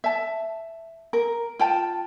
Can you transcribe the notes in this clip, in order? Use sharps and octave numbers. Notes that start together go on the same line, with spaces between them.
E5 A5
A#4
F4 G5 A5